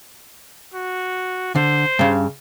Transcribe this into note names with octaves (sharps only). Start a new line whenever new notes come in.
F#4
D3 C5
G2 C#3